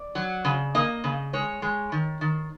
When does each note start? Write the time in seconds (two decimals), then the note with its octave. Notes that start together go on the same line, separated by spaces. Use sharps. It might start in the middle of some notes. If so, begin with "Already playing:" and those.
Already playing: D5
0.15 F#3
0.45 C#3
0.75 A#3 D#5
1.04 C#3
1.33 G#3 C#5
1.62 G#3
1.92 D#3
2.21 D#3